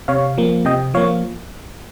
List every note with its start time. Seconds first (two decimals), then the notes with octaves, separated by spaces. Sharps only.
0.08 C3 C#5 F5
0.38 F3 A#3
0.65 C3 D#5 G5
0.94 F3 A#3 C#5 F5